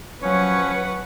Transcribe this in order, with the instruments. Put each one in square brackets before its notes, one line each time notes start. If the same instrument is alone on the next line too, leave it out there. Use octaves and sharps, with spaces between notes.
[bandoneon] F3 C#4 [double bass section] F#3 [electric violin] B4 F#5 [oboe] C#5